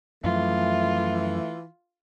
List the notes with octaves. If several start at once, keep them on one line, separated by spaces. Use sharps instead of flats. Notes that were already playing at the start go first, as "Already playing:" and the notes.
F#2 E3 F3 A3 F4